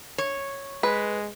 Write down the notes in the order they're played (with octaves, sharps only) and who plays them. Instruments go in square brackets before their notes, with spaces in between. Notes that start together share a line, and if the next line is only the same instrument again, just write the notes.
[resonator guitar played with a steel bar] C#5
[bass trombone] G#3 [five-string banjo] B4